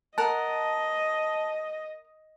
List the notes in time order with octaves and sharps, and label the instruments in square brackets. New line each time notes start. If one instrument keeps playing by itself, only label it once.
[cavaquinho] A#4 F#5 [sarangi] D#5 [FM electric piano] A5